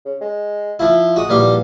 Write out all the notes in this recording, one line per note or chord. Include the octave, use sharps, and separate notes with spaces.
C#3
G#3
F3 E4 F4
G#3 F#4 D#6
A#1 E2 G3 F5